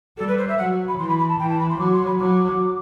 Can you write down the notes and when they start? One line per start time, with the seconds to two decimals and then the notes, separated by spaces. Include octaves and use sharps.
0.17 G3 A4
0.27 B4
0.38 C5
0.48 E5
0.57 F#3 F#5
0.88 B5
0.98 E3 C6
1.08 B5
1.19 B5
1.28 A5
1.39 E3 G5
1.49 A5
1.59 B5
1.69 C6
1.79 F#3 D6
1.93 C6
2.06 B5
2.19 F#3 D6